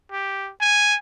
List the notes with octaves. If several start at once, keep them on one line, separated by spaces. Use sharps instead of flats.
G4
G#5